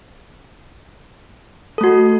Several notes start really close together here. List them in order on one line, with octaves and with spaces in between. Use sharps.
A4 A3 F#4